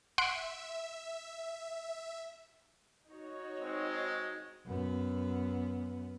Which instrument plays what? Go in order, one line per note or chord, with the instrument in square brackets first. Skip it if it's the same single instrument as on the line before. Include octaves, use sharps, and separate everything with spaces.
[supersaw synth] E5 [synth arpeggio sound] F#5 C6 D7
[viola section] D#4 F#4 C#5
[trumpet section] G#3 C4
[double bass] F#2 B3